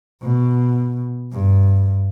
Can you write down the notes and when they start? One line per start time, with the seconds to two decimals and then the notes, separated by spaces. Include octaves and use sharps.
0.22 B2
1.32 G2